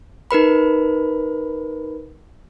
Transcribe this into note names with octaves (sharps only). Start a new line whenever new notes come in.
D#4 A#4 B4 B5